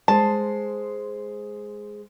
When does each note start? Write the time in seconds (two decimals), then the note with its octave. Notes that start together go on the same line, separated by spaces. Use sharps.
0.08 G#3 C5 A5